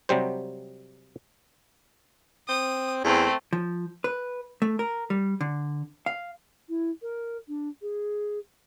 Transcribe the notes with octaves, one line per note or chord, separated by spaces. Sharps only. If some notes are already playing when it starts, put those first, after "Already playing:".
C3 F#3 G3 C5
C4 D#6
E2 A3 C4
F3
B4
A3
A#4
G3
D3
F5
E4
A#4
D4
G#4